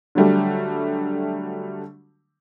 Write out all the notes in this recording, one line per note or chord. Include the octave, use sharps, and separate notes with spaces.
D3 F#3 G3 A3